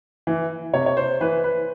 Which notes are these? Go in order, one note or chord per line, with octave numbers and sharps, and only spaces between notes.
E3
C3 C#5
C#5
C5
E3 B4
B4